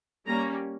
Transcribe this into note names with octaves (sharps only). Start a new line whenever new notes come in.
G3 A#3 C#4 A#5